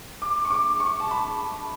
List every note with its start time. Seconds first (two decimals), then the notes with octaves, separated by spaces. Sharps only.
0.22 D6
0.45 C#6
0.50 D6
0.80 C#6
1.00 A5
1.11 B5